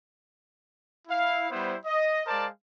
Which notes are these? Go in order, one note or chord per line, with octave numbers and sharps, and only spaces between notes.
E4 F5
G3 B3 E4 C5
D#5
G#3 A#4 C5 D5 F5 A5